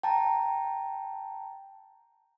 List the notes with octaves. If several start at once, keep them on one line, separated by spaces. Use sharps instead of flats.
G5 A5 A#5